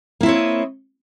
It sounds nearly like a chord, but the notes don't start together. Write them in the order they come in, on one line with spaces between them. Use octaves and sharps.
A#3 E4 C4 C#5 D#5